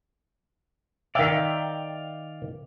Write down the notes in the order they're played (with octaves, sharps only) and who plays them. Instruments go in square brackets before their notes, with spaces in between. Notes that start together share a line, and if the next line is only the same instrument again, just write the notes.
[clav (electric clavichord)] D#3 E5 [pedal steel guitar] D5 F5 G5